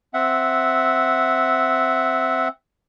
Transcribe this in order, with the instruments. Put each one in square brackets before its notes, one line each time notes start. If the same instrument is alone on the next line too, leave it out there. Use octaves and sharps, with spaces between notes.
[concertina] C4 E5 F#5